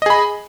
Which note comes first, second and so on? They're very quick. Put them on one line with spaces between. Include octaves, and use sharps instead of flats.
D#5 G#4 B5